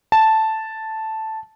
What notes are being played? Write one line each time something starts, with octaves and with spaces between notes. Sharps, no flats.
A5